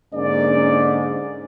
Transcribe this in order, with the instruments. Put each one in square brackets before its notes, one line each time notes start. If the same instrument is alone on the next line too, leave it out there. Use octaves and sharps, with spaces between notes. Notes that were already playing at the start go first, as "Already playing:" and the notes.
[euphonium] G#2 [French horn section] D3 A#3 C#4 [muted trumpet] D5